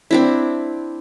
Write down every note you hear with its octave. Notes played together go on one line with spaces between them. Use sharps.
C4 D4 E4